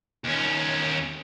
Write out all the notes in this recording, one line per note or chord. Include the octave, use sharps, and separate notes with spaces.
D#2 C#4